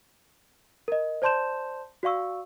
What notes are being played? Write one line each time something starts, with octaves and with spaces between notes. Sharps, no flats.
A#4 D#5
C5 D5 A5 C6 G6 E7
F#4 D5 F5 C#6 E6